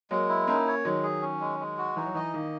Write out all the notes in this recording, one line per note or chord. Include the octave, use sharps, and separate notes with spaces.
F#3 G#3 A#3
E4
A#3 C#4 D#4
C#5
D#3 F#3 G#3
G#4
C#4
G#3
G#3
F#4
E3 D#4
F#3
E3 D#5
D#3 A#3